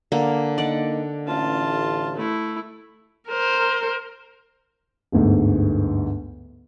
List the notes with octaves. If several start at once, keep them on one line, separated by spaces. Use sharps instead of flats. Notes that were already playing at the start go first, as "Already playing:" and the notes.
D3 A#3
A#3 D#4 D5 D#5 F#5
A1 F4 A5
A3 E4
A#4 C5
G1 D2 G#2